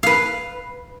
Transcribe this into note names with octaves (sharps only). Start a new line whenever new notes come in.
B4 F5